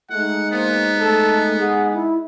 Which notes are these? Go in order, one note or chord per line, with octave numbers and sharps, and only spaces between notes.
G#3 A3 D#4 F#5
A#3 B3 C5
A3 A4
G#4 F#5
E4